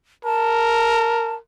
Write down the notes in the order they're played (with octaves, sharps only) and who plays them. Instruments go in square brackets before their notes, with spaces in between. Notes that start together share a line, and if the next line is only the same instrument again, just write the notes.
[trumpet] A#4 [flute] A5